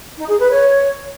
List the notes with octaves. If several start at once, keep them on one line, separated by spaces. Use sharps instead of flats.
D#4
G#4
B4
C#5